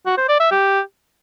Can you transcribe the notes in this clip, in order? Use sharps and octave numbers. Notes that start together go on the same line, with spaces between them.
F#4
C5
D5
E5
G4